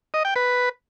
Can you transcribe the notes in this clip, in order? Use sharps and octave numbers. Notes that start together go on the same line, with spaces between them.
D#5
G5
B4